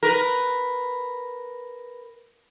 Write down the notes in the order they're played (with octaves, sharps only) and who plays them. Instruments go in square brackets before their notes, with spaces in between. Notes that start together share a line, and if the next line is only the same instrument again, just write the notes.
[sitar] A#4 B4